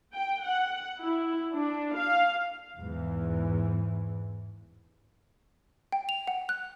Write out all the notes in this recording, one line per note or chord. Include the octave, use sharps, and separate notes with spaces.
G5
F#5
E4
D4
F5
E2 G#2 E3
G5
F7
F#5
F#6